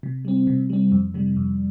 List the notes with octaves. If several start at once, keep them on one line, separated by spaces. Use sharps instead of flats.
C3
G3 C4
C3
G3 C4
F2
C3 G3
F2